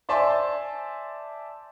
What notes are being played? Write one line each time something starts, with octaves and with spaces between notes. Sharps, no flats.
C5 D5 E5 G#5 A5 C6